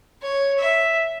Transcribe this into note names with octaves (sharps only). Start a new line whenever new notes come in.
C#5
E5